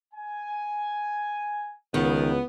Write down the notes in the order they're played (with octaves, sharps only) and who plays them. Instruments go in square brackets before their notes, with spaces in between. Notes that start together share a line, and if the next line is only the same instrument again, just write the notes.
[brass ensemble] G#5
[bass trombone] C#2 [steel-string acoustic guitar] D#3 [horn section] B3